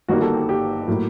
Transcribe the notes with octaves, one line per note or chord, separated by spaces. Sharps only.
G1 G2 D#3 G3 A#3 F#4
F#4 A4
G4
G4
A2 F#3 A#3